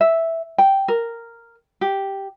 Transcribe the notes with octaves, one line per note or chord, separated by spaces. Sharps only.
E5
G5
A#4
G4